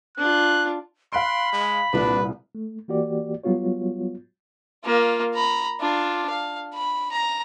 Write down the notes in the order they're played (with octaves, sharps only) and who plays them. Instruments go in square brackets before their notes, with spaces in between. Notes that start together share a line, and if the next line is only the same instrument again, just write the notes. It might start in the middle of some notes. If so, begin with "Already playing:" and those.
[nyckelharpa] D4 F4 [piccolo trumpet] F#6
[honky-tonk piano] F5 F#6 D7 [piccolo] B5 [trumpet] C6
[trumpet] G#3
[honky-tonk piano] C2 A#2 [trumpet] D4 [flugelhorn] B4
[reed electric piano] A3
E3 A#3 F#4 G4 D5
F#3 G3 B3 F4 F#4 C#5
[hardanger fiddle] A#3 F4
A#5 B5
D4 F4
F5
B5
A#5